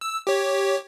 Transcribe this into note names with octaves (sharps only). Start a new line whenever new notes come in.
E6
G4 C#5